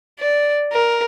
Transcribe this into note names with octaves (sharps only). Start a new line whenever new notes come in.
D5
A#4